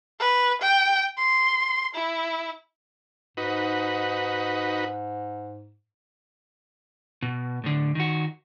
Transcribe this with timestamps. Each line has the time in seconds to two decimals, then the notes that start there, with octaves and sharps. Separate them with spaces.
0.20 B4
0.62 G5
1.18 C6
1.95 E4
3.37 G#2 D#4 F#4 B4
7.22 B2
7.64 A2 D3
7.95 D#3 F#4